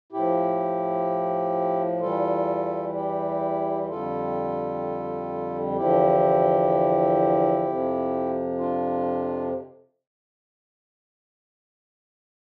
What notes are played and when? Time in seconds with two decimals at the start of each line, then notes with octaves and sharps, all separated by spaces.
0.13 A2 F3 E4 G4
2.00 E2 E3 G3 F4 A4
2.94 E4 G4
3.88 F2 D3 G3 F4 A4
5.77 E2 D3 F3 E4 G4
7.65 F2 C3 F3
8.59 D4 F4